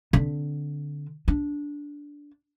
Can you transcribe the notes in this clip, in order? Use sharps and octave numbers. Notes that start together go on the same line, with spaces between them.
D3 C4
D4